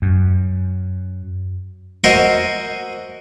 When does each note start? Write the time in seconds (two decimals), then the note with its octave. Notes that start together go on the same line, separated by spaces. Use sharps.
0.02 F#2
2.04 F#4 A#4 C5 D#5 E5 G#5